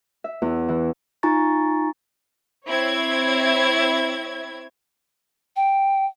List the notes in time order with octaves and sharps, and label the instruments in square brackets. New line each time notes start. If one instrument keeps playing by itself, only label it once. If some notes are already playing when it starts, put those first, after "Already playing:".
[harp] E5
E2
E3
[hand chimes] D#4 F4 G#5 A#5 C#6 A6
[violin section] C4 E4 C#5 E5 G#6
[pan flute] G5